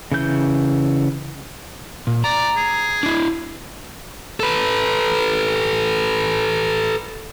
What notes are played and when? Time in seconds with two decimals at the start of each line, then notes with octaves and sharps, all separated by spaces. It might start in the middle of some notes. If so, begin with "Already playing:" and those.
0.12 C#3 E3 G6
2.07 A#2
2.24 D5 A#5
2.57 G#4
3.03 D4 E4
4.40 A4 B4